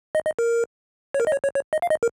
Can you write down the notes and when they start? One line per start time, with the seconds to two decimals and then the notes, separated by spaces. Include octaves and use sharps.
0.15 D#5
0.26 D#5
0.39 A#4
1.14 C#5
1.20 A#4
1.27 D#5
1.32 C#5
1.44 C#5
1.55 C#5
1.73 D#5
1.82 F5
1.90 D#5
2.03 A#4